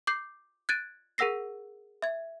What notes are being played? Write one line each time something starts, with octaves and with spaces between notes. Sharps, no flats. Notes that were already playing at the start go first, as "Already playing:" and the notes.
D6 G6 C7
F#6 G#6 A6 D7 D#7
G#4 A#4 F#5 E6 A#6 C7
E5 G#6